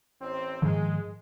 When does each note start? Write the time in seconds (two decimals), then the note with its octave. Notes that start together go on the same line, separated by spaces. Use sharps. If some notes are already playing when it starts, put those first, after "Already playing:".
0.21 A1 C4
0.62 G#2 D#3 F3 G#3